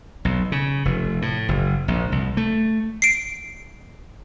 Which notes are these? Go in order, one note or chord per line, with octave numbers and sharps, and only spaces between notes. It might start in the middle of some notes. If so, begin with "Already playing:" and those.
B1
C#3
F1
A2
F#1
A#1
C2
A3
C7 D7